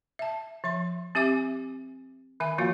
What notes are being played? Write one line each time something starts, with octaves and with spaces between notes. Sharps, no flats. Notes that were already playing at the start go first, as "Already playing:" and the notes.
E5 A5
F3 E5 C6
C4 G4 E5 G#5 D6
D#3 E5 G#5
F3 A#3 F4 F#4 F5